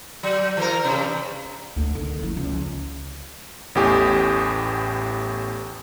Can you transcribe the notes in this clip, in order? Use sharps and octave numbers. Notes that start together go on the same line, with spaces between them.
F#3
E3 A#4
G2 C3
D2
D3 D#3
F#1 F3
C#2
A1 E2 A2 G4 G#5 D#6